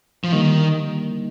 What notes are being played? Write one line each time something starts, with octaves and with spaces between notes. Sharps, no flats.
F3
D3 D#3 G3 A#3 D#4